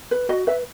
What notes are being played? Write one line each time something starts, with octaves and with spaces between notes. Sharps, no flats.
B4
F#4 D#5
B4 E5